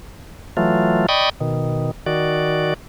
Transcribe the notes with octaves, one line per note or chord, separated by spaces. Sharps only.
E3 F#3 A3 F4
D5 D#5 G5 B5 C#6 D#6
B2 D#3
D#3 F#4 D5